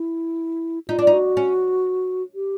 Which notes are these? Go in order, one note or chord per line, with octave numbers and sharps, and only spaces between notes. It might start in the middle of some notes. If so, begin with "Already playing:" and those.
Already playing: E4
D#4 F4
D4
D#4
F#4
C#4
G4